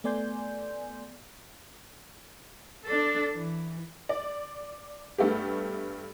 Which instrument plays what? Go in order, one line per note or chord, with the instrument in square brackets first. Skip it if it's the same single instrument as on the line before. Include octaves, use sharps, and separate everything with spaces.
[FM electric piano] A3 B3 D5 G#5 C6 G6
[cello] D4 A4
E3
[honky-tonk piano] D5
G2 A3 B3 G4